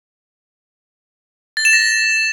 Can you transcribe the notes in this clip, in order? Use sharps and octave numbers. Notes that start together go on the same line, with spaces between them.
A6
E7
A#6